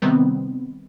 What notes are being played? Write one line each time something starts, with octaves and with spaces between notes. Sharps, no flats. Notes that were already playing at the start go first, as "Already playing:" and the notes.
C3 D#3 G3 B3 C4